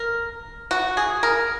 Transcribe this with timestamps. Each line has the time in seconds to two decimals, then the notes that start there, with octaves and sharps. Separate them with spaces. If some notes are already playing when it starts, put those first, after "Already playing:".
Already playing: A#4
0.71 F#4
0.97 G#4
1.23 A#4